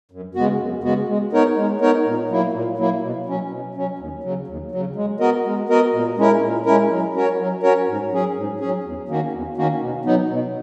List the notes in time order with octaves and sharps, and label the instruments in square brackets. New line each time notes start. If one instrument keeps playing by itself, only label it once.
[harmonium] F#2
C#3 G#3 B3 F#4
F#2
C#3 G#3 B3 F#4
G#3
B3 D#4 A#4 C#5
G#3
B3 D#4 A#4 C#5
A#2
F#3 A#3 E4
A#2
F#3 A#3 E4
B2
F#3 C#4
B2
F#3 C#4
D#2
C#3 F#3
D#2
C#3 F#3
G#3
B3 F#4 A#4 D#5
G#3
B3 F#4 A#4 D#5
A#2
G#3 C#4 E4 A#4
A#2
G#3 C#4 E4 A#4
F#3
C#4 F#4 A#4 C#5
F#3
C#4 F#4 A#4 C#5
G#2
F#3 C#4 G#4
G#2
F#3 C#4 G#4
E2
D#3 A#3 C#4 F#4
E2
D#3 A#3 C#4 F#4
B2
F#3 B3 D#4
B2